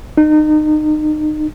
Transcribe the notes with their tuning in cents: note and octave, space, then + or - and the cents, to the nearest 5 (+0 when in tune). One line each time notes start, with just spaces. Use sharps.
D#4 -30